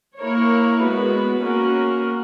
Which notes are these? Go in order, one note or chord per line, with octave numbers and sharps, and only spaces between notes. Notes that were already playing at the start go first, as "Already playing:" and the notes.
A#3 E4 A#4 C#5
G#3 B3 F#4 B4
A#3 C#4 F#4 A#4